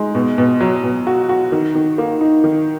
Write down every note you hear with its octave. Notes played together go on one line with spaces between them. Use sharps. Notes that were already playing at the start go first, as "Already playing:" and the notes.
Already playing: G#3 D#4
B2
B2
F#3
B2
F#4
F#4
D#3
D#3
A#3
D#4
D#3